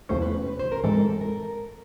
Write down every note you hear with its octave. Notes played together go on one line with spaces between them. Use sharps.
E2 C3 F3 A3 C#4 C5
B4
B4
C5
A#4
A2 E3 G#3 C4 A4
A#4